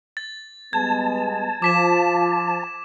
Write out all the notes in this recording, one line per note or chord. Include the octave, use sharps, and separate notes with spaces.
A6
G3 G#3 B3 A5 G#6
F3 D6 B6 E7